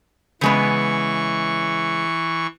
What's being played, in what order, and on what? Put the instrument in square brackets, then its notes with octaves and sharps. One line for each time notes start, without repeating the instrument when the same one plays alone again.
[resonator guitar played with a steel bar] C#3 G#3 B3 [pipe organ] E3 C#6